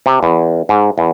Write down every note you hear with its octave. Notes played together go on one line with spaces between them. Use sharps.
C3
E2
G#2
E2